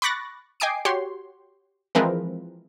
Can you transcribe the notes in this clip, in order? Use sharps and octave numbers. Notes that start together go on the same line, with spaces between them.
B5 C#6 D6 F#6 A6 A#6
D#5 G5 G#5 D6 C7 D7
F#4 G4 C#5 C6
E3 F3 G#3 C4 A#4 B4